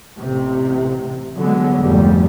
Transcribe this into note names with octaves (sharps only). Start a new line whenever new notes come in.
A1 C3
D3 F#3 G#3 B3
F1 D2 G#2 G3